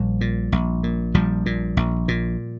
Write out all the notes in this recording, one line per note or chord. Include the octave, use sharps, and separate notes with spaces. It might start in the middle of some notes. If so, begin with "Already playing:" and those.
Already playing: A#1 G3
A#2
A#1
A#2
A#1 F3 G3
A#2
A#1
A#2